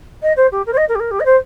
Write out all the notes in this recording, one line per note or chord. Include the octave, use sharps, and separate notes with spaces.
D#5
C5
G4
A#4
C5
D#5
A#4
G4
A#4
G4
D#5
C5